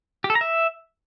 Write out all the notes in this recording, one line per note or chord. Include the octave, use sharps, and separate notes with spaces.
G4
A4
A#5
E5